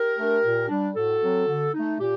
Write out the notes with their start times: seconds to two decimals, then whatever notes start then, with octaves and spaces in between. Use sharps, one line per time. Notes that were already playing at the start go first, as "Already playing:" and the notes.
Already playing: G4 A#4
0.17 A3 D4
0.43 A#2
0.69 G3 D4
0.95 A2 F#4 A4
1.21 F#3 C4
1.47 D3
1.74 A3 D#4
2.00 A#2 G4